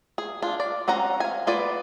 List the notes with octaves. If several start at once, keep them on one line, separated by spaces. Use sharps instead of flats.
G#4
D4 F4
D5
C4 C#4 F#5 A#5
F5 G#5
B3 F4 B4 D5